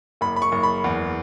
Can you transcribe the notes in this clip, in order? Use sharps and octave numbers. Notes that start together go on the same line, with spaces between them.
F#1 B5
B5
C#6
F#1
B5
E2